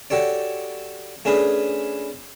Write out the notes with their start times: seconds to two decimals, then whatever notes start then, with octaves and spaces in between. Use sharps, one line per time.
0.10 F#4 G4 A4 C#5 D5
1.25 A3 C#4 D4 G#4 B4